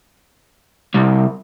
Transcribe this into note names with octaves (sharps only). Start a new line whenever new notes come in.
C2